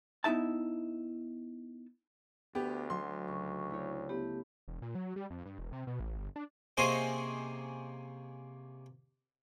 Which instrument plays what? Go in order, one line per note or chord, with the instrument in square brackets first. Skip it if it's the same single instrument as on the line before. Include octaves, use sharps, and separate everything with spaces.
[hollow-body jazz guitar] B3 D#4 E4 E5 A5
[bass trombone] D2 [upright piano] B3 G4
[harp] F#3 C4 [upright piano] C6
[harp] C#2 [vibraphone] C#6
[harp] A3 E4 C#5
[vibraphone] A3 B3 G4 [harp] B5
[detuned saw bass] E1
A#2
F#3
G3
F2
G2
E1
C3
B2
A1
G1
D4
[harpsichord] C3 A#3 C#4 G#4 C5 D#5